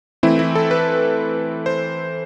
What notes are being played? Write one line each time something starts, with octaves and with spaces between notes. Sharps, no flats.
E3 A3 C4 E4
E4
A4
B4
C5